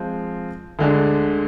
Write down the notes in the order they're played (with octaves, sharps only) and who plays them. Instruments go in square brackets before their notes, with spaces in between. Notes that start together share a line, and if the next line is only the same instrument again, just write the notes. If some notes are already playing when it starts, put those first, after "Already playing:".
Already playing: [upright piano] F3 G#3 C4
D2 D3 G#3 D4